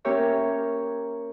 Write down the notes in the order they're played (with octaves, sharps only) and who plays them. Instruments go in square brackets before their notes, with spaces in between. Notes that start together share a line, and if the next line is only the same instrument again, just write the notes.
[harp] A#3 C#4 G4 A#4 C#5 E5